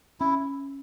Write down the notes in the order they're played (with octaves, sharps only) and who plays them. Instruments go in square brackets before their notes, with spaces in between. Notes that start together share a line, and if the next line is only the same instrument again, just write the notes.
[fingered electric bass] C#4 [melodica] E4